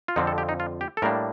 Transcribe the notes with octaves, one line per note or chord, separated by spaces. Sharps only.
F4
F2 D3 F3 C4 D#4
A4
G4
D#4
F4
G4
A4
A2 G3 A#3 D4 A#4